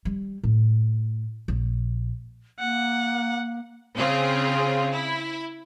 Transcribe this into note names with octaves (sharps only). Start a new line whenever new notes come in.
G3
A2
A#1
A#3 F#5
C#3 C4 F4 G#4
E4